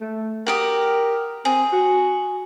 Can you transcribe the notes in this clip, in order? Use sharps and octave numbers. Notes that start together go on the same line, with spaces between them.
A3
F#4 G4 A#4 D#6
C4 G#4
F#4